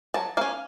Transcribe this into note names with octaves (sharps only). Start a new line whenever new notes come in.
F#3 A5
A#3 C#4 F5